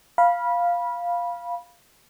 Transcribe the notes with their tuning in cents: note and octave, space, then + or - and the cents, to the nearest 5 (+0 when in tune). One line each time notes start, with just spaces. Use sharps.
F5 +0 B5 -20